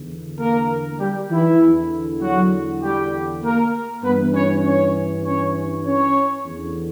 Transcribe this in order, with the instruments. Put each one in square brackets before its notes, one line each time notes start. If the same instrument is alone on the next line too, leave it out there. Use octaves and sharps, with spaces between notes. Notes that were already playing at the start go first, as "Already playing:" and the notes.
Already playing: [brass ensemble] E2 D3
A#3 A#4
G3 G4
E3 E4
E2 D3
F#3 F#4
G3 G4
A#3 A#4
G2 E3 B3 B4
C#4 C#5
C#4 C#5
C#4 C#5
C#4 C#5
E2 D3